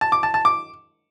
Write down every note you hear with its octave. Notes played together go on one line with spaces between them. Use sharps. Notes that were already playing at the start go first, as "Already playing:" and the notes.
A5
D6
A5
A5
D6